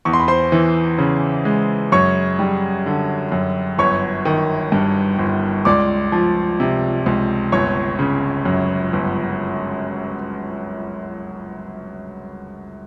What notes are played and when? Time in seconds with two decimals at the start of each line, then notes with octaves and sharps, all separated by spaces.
0.05 E2 C#6
0.13 C6
0.20 B5
0.28 C5 C6
0.52 E3
0.98 C#3
1.45 G#3
1.92 F#2 C#5 C#6
2.39 G3
2.86 D3
3.32 F#2
3.79 G1 C#5 C#6
4.25 D#3
4.72 G2
5.19 G1
5.65 C#2 D5 D6
6.12 F3
6.60 C3
7.06 C#2
7.52 G1 C#5 C#6
7.99 C#3
8.45 F#2
8.93 G1